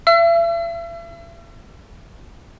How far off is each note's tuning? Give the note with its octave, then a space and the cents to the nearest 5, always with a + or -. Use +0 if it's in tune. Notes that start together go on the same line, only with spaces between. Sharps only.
E5 +40 E6 +40